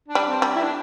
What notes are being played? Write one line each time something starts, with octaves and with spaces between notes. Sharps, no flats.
D4
G3
C4
G3
E4
D4